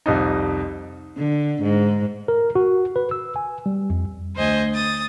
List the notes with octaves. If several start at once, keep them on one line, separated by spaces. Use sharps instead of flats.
C2 F2 D#4
D3
G#2
A#4
F#4
B4
E6
G#5
G3
F2
D2 C5 D#5 G#5
D#6 A6